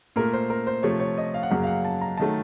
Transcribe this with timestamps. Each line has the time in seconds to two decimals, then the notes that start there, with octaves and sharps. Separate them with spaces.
0.16 A#2 A3 A#4
0.33 C5
0.50 A#4
0.67 C5
0.83 C3 F3 A3 C#5
1.00 C#5
1.17 D#5
1.34 F5
1.43 F#5
1.50 F#2 C#3 F#3 A#3 F5
1.63 F5
1.67 F#5
1.85 A5
2.01 A#5
2.17 D#3 F#3 A3 A5